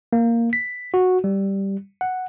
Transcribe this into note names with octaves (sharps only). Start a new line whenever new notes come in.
A#3
B6
F#4
G3
F#5